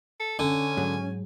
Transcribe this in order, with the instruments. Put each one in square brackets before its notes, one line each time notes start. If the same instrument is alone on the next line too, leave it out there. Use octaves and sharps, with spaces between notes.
[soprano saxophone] A4
[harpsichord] D3 [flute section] C#4 [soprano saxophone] G#5
[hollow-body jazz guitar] G#2 F#3